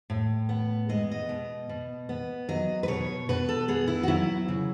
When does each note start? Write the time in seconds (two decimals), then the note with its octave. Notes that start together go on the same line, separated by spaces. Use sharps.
0.10 A2
0.49 B3
0.89 G#3 D#5
1.11 D#5
1.29 B2
1.69 B2
2.09 B3
2.49 F#3 D#5
2.83 B4
2.88 B2 C#5
3.29 B2 B4
3.49 A4
3.68 B3 G#4
3.88 E4
4.03 F#4
4.08 F#3 E4
4.48 C#3